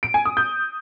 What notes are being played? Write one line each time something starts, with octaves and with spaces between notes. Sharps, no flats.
D7
G#5
D#6
G6